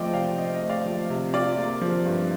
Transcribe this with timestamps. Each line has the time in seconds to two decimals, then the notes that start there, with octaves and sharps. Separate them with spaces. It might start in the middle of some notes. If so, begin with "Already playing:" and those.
Already playing: F3 A3 C4 D5 D#5 G5
0.14 C3 D5 F5
0.38 C4 D#5
0.54 D#5
0.62 A3
0.69 D5 F5
0.85 F3
1.10 C3
1.34 F4 D5
1.58 A#3
1.81 F3
2.05 G2